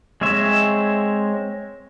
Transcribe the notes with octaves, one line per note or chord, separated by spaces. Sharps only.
G#3 C4 C#5 E5